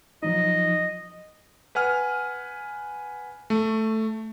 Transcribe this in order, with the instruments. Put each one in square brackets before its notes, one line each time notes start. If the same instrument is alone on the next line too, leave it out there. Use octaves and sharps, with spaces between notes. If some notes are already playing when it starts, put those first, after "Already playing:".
[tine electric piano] F3 F#3 D#4 [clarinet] D#5
[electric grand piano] B4 F#5 G#5 F6
A3